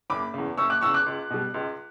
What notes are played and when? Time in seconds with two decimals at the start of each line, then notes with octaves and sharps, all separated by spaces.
0.10 F#1 B5 D6
0.34 E2 C#3
0.57 F#1 C#6 E6
0.70 D6 F#6
0.81 E2 C#3 C#6 E6
0.94 D6 F#6
1.06 C#2
1.30 B2 G3
1.54 C#2